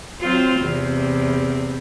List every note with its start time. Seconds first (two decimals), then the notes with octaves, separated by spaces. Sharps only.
0.20 F#3 C4 F4
0.60 E2 C3